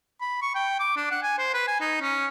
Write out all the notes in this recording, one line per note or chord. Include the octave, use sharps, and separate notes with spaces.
B5
C#6
G5
D6
D4
F#5
G#5
C5
B4
G#5
D#4
C#4